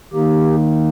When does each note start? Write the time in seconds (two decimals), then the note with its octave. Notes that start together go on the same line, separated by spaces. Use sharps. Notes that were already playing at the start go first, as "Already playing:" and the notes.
0.13 D#3 A#3 D#4 G4